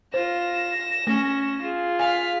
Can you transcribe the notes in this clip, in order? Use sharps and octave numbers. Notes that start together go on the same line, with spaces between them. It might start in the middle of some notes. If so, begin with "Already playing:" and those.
F4 C5 A#6 E7
A3 C#4
F4 G#4
F5 G#5 B6